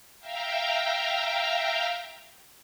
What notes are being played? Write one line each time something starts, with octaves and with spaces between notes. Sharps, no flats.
E5 F5 G5 A#5